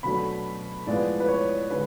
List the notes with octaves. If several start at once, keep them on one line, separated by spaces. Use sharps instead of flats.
B2 F#3 A3 D4 B5
A2 F3 G#3 B3 D5
B4
C#5
D3 G#3 B4